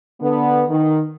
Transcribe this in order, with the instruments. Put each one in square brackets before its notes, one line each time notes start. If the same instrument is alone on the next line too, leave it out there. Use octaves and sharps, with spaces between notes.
[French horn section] D3 B3
D#3